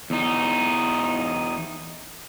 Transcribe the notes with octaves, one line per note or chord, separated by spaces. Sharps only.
E2 D#4